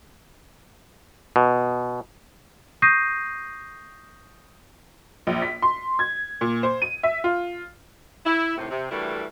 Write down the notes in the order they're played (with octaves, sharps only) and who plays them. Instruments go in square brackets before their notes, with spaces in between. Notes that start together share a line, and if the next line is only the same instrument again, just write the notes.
[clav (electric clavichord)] B2
[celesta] C#6 D#6 G6 A#6 C7 D#7
[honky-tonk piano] A#1
B6
C6
G#6
A#2
C5
D#7
E5
F4
[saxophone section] E4
D#2 A2 C3
C3
D2 E3 G3 A3 E4 A#4